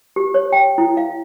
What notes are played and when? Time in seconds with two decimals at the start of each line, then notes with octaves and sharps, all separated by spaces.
0.16 G4
0.34 C#5
0.52 G5
0.78 E4
0.97 F5